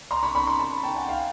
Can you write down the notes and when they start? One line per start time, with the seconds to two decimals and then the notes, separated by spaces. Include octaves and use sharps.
0.11 A#5 C6
0.23 B5 C#6
0.35 B5 C#6
0.47 A#5 C6
0.59 A5 B5
0.83 G5 A5
0.96 F#5 G#5
1.08 F5 G5